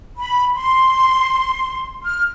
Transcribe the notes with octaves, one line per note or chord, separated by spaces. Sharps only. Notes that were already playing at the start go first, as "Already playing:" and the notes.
B5
C6
F6